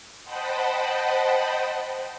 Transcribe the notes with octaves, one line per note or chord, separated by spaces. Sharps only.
C5 D#5 F#5 G5 A5 B5